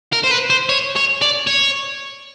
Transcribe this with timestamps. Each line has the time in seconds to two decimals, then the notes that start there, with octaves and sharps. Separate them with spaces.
0.13 A#4
0.24 C5
0.31 B4
0.50 C5
0.69 C#5
0.96 C#5
1.21 D5
1.47 C#5